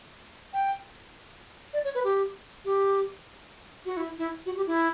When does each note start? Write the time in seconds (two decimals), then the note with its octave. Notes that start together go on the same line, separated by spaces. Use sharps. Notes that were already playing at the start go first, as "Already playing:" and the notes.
0.53 G5
1.73 D5
1.84 C#5
1.95 B4
2.04 G4
2.65 G4
3.85 F#4
3.97 E4
4.18 E4
4.46 F#4
4.57 G4
4.67 E4